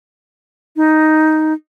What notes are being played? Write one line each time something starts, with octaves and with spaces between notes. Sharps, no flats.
D#4